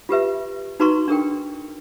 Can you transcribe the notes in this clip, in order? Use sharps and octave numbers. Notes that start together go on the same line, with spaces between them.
F4 G4 B4 E5
D#4 F#4 B4 A#5 C6 C#6
D4 G#4 A#4 G5